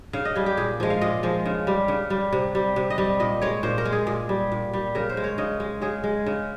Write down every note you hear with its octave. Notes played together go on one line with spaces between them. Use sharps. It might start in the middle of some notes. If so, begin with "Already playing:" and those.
C#3 F5
D#5
G3 G#4
G4
A#2 G#4
F3 G#3
F5
A#2 D#5
F3 G#3
C#3
G3
C#3
G3
C3
G3
C3
D#5
G3
A#2 D#5
G#3 C#5
A#2 C5
A#4
G#3
G#4
A#2 G#4
G3
A#2
G3
C#3 A#4
C5
G#3
C#5
C#3 D#5
G#3
C#3 G#4
G#3
C#3